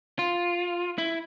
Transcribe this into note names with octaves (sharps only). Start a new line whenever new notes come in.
F4
E4